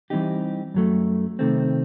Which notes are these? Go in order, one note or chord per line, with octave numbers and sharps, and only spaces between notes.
E3 G3 C4 D#4 G4
F#2 F#3 A3
C3 D#3 A3 C4